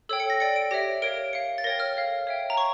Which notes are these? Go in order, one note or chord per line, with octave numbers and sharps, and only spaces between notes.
A4 C#5 G5 E6
C#7
A#6
A4 D5 G5 C#7
D7
G4 C#5 E5 A#6
A#4 C#5 F5 D7
C#5 F5 C#7
A6
A#4 C#5 G5 A#6
F6
A4 C#5 F5
C#5 E5 G5
A#5
C#5 C#6